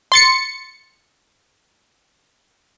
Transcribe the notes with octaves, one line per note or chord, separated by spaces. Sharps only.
C6 A6 C#7